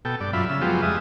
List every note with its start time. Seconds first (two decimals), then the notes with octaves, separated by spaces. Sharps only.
0.05 B2 A4 G5
0.21 G2 D5
0.33 F#2 F4 E5 B5
0.49 C#3 E6
0.61 F3 F#3 G#3 B3 F4 G4
0.82 F2 G3 G#3 E5 D#6